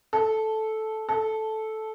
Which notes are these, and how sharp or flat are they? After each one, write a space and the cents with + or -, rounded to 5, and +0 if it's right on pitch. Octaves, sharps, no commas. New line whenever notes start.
A4 -10
A4 -10